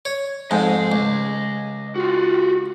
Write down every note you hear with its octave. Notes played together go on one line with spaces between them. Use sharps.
C#5
F2 G#2 D#5 G#5
C#2
F4 F#4